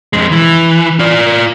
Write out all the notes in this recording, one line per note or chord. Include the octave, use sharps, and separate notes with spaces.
F2 G#3
E3
F4 D5